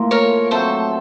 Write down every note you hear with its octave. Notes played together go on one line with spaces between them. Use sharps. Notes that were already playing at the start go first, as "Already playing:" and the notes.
Already playing: A2 F3 A#3
A#4 C#5
F#3 A3 C4 A4 C5